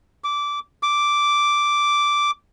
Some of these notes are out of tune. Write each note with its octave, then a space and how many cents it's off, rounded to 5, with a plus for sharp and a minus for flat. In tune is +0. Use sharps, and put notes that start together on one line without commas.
D6 -15
D6 -5